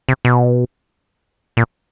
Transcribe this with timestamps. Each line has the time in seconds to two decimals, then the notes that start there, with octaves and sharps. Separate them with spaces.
0.09 C3
0.25 B2
1.57 A#2